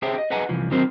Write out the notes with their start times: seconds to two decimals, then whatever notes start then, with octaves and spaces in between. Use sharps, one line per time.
0.02 G4 G#4 C5 C#5 E5 G5
0.18 D#5
0.30 G#4 B4 D#5 F#5 G#5 A#5
0.49 C2 E3 F3
0.71 D#3 F#3 C4 A#4 C5